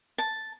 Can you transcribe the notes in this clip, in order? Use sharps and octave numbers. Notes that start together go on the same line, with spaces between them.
A5